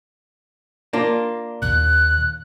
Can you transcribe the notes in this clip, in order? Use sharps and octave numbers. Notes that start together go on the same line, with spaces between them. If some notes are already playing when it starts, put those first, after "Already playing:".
A#3 D4 F4
D#2 A#2 F#6